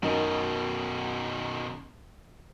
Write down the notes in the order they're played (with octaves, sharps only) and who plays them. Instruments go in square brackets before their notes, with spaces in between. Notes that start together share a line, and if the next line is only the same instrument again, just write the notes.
[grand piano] F#2 D#4 A#4 [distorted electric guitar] B2 D#3